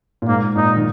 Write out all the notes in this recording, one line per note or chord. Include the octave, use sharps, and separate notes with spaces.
A#2
G#2 A#3
A#2 D#4
D#3